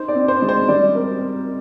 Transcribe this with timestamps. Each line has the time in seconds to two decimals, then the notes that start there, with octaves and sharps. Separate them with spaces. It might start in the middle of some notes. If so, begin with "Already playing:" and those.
Already playing: D#4 C5
0.08 D5
0.15 C4
0.28 C5
0.42 G#3
0.49 C5
0.68 G3 D5
0.95 C4 A#4